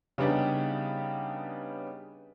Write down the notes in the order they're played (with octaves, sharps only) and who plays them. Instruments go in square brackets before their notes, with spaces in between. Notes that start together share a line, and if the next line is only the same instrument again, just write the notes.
[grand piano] C#3 G3 B3 D4 D#4 G4